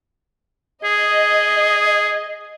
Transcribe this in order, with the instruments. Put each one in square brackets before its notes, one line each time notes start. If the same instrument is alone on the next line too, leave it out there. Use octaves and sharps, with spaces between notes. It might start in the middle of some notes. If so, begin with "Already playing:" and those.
[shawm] G#4 [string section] D#5